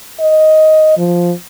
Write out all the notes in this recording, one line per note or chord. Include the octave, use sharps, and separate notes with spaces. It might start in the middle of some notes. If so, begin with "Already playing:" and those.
D#5
F3